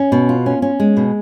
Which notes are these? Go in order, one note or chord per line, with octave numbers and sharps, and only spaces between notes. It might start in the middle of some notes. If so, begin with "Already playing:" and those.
Already playing: C#4
B2
F4
C#4
C#4
G#3
B2